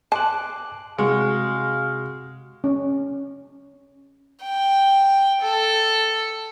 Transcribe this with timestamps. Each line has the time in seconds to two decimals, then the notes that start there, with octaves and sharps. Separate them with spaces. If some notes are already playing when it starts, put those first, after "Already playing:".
0.12 A5 C6 D6 F#6
0.98 C3 G#3 F#4 F5 C#6
2.64 C#4
4.43 G5
5.42 A4